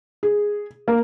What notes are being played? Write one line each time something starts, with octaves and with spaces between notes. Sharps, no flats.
G#4
A#3